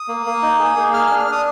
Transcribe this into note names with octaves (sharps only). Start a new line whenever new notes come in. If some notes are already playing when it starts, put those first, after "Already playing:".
Already playing: D#6
A#3
A#3
D#4
G#4
A#3
G#4 F6
F6
D4
F6
D4 D#6